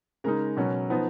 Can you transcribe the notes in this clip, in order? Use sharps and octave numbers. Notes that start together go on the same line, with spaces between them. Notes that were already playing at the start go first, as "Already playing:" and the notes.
C#3 G#3 D#4 A#4
B2 F#3 C#4
F3 B3 D#4